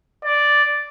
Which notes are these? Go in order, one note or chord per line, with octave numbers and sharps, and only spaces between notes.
D5